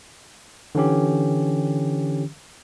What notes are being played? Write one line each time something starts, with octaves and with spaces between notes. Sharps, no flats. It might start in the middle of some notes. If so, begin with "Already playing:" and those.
D3 E3 C#4 G4